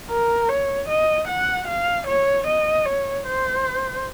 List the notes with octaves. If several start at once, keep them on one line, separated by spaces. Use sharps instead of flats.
A#4
C#5
D#5
F#5
F5
C#5
D#5
C#5
C5